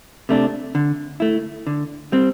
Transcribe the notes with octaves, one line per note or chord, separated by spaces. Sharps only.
C3 A3 D4
D3
A3 E4
D3
G3 C4